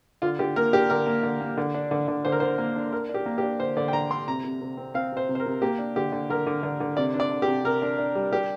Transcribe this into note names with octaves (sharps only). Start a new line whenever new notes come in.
D3 F4
D3 G4
A#3 A#4
D4 G4
D3 A#4
A#3
D3
A#3
D3
D4
D3
D3
D3 C5
A#4
D3 C5
A#3
D4
D4 A#4
D4
G4
A#3
G4
D4
D3 C5
D3 D5
G5
D3 A#5
D4 C6
C3 A#5
C3
C3
C4
C4 F5
C3 C5
C3
C5
A#4
C3
A#3 G4
D4
D3 G4
D3
D3 A#4
D3
D3
D3
C3 D5
D4
D5
D4
G4
C3
C3 A#4
D4
D4
G3
D4 G4